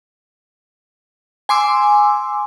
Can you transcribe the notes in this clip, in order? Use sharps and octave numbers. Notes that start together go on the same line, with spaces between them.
G#5 C6 D6 E6